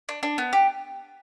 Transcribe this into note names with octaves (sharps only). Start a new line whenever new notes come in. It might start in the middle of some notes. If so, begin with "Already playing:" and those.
D4
D4
B3
G4